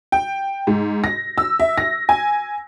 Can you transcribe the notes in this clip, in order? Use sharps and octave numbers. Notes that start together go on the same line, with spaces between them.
G5
G#2
A#6
E6
E5
A#6
G#5